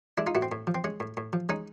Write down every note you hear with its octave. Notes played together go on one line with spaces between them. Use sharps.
G#3 D4 E4
D#4 F4
A2 E4 F#4
C4
A2
F3
C4
G#3 C#4
A2
A2
F3
G#3 C#4 D#4